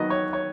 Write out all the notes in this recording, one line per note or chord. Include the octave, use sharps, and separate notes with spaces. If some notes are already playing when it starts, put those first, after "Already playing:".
Already playing: D#3 F#3 B3 D#5
C#5
C#5